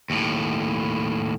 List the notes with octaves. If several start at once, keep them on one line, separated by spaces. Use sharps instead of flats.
D#2 A2